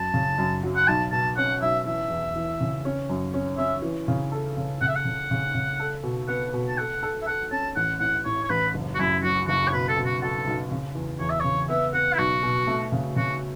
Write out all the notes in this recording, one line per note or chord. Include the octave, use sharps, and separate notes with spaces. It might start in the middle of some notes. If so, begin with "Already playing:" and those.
Already playing: F#2 A5
C#3
F#2
F#3
F#5
B1 A5
B2 A5
C#4 F#5
B1 E5
E3 E5
E2
E3
C#3
C#4
F#2
C#4
C#4 E5
E3
C#3
A4
C#3
C#3 F#5
E5
F#5
C#3
C#3
C#3
A4
B2
B3 F#5
B2
A5
A4 F#5
A4
E5
A4 F#5
C#4 A5
A1 F#5
A2 F#5
A2 C#5
C#5
A1 B4
F#1
F#4
F#2 E4
F#3 F#4
F#1 F#4
C#5
B2 B4
A4
B2
F#4
F#4 A4
B1
C#3
E2
E2 C#5
E5
C#3 C#5
B3 E5
B3 F#5
E4
B1 F#4
B2
A3
C#3
C#3 F#4